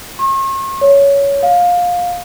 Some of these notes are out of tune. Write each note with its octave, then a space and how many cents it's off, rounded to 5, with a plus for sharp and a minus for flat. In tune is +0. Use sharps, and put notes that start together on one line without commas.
C#6 -45
C#5 +15
F5 +20